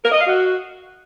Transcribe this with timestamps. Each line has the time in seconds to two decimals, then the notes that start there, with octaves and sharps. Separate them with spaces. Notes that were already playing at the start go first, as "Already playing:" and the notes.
0.04 A#4
0.12 D#5
0.19 F5
0.27 F#4